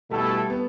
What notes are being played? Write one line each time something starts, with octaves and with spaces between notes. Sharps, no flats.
B2 G3 A3 E4 A4
B3